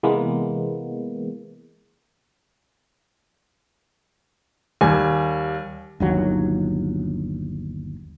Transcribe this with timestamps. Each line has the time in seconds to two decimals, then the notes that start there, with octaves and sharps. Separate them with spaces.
0.03 C3 E3 G#3 A#3 B3
4.81 D#2 G3 G#5
6.00 G1 D#2 F#3